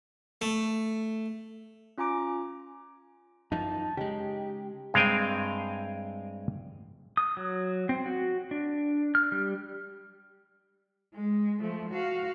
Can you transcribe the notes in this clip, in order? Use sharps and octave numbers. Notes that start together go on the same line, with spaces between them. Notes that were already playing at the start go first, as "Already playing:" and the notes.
A3
C#4 F4 G#5 A#5 D6 D7
F#2 E3 F3 D#4 A5
C#3 G#3 D#4 G4
G2 G#3 C4 F5 G5 G#5
D#6
F#3
C4
F#4
D4
F6
G3
G#3
F3 A3
F#4 F5